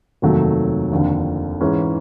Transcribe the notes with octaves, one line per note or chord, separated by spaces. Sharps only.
F1 D#2 D#3 F#3 A3
F1 D#2 D3 F3
G#2 E3 G#3 C#4